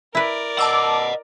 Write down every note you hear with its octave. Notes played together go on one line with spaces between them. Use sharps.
E4 A#4 B4 D5
D#5 F#5 A5 D6 E6